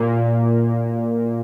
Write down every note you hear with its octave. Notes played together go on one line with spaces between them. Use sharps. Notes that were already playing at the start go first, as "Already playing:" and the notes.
Already playing: A#2 A#3